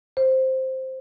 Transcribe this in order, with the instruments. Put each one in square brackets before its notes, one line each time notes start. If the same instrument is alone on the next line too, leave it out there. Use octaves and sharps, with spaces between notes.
[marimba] C5